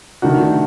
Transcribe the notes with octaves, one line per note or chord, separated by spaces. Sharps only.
D#3 A3 D4 F#4